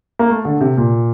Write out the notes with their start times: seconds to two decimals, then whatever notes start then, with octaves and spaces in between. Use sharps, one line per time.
0.19 A#3
0.30 A3
0.45 D3
0.61 C3
0.77 A#2